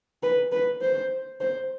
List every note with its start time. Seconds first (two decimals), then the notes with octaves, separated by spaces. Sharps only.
0.23 B4
0.52 B4
0.81 C5
1.40 C5